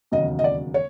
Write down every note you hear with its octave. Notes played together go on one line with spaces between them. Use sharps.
E1 D#2 C#3 F#3 D#5
D#5
D5
C#5